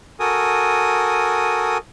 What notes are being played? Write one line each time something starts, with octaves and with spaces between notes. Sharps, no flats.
F#4 A4 A#4 G#5 D#6